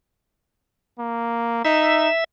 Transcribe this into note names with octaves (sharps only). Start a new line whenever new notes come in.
A#3
D#4 E5